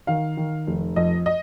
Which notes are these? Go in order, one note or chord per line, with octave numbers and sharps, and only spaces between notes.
D#3 F5
D#3
F1
F2 D#5
D#5